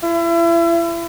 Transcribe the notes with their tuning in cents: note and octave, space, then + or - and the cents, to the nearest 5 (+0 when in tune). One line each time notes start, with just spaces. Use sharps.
E4 +35